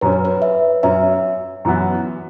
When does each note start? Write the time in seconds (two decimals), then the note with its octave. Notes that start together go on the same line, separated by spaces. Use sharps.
0.01 F#2 F#3 C#4 B4
0.12 C#5
0.25 B4
0.42 E5
0.83 F#2 F#3 C#4 E5
1.65 F#2 E3 B3 F#4